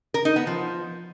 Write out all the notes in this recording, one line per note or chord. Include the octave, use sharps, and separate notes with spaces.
A#4
D#4
B3
F3